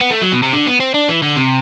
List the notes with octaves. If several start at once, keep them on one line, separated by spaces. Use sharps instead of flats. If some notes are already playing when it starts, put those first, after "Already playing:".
B3
A3
F#3
B2
C3
D3
B3
C4
D4
E3
D3
C3